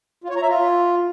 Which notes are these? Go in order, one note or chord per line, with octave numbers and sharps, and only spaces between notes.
F4
C#5
A#5
E5
F4